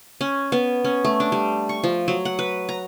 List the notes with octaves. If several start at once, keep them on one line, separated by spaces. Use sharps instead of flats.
C#4
B3
C#4
A3
D4
G3
C#6
F3
F#3
F#5
B4
A#5